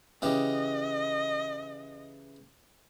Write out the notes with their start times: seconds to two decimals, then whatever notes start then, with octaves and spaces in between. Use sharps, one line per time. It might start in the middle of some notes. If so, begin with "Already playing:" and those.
0.22 C#3 E3 G4 D#5